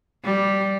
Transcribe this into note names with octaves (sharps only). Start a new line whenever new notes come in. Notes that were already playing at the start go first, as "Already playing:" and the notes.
G3